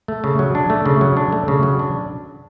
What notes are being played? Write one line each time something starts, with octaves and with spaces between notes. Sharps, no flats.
A3
C#3
F#3
D4
A3
C#3
F#3
D4
A3
C#3
F#3
D4